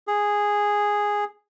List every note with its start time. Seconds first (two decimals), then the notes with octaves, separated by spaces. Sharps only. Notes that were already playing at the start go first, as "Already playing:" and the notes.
0.07 G#4